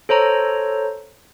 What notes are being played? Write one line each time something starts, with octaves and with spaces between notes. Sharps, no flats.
A4 C5 C#5 A#5